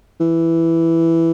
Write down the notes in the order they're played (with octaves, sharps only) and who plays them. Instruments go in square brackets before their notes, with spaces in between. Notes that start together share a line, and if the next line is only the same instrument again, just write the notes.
[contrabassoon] E3